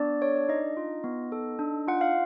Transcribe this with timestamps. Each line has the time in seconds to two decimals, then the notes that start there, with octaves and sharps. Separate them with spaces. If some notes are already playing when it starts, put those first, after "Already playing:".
Already playing: B3 D4 D5
0.22 A4 C#5
0.36 D5
0.49 D4 D#4 D#5
0.77 F4
1.04 B3
1.32 A4
1.59 D4
1.88 F4 F#5
2.01 F5